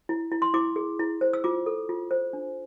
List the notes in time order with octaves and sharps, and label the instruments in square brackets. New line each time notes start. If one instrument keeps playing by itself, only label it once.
[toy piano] E4
E4
C6
E4 D6
G#4
E4
C5
E6
F4 D6
A4
F4
C5
D4